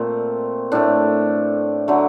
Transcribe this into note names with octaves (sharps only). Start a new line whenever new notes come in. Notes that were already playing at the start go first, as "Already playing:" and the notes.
Already playing: A#2 A3 C4
A2 A3 D4
D3 F#3 A3